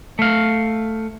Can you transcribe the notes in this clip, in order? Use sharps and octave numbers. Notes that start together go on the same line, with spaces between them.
A3 F5